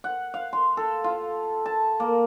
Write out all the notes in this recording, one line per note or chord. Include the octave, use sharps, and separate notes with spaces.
F#5
F5
C6
A4
F4
A5
A#3